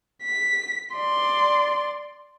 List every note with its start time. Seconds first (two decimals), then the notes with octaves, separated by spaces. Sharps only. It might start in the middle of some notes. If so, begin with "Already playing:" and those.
0.23 B6
0.95 D5 C6